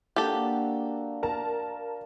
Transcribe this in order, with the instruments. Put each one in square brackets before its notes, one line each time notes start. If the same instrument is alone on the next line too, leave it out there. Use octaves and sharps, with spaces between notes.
[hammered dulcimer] A#3 D4 F#4 [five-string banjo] G4 A4
[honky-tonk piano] A#4 A5